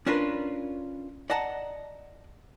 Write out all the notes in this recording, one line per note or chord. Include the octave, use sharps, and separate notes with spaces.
C#4 D4 F4 A#4 B4
D5 D#5 F#5 A5 A#5